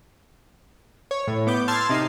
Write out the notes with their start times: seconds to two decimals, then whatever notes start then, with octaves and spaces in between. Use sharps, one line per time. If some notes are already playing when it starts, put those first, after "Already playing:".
1.11 C#5
1.27 A2
1.47 B3 D6 G6
1.68 A5 C6 E6 F6 G#6 A6
1.89 C3 D#4 C7